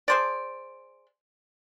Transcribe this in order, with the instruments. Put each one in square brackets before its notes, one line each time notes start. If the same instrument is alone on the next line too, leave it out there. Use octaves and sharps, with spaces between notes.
[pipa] G#4 C5 D5